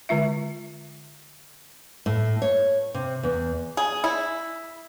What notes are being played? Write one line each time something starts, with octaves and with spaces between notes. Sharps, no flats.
D3 G#3 F4 E5
A2
C#5
C3
E2
G#4
E4